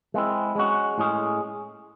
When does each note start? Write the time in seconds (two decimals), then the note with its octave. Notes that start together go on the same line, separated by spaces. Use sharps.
0.14 G#3 C4 E4
0.55 G#3 C#4 F#4
0.98 A2 G#3 C#4 G#4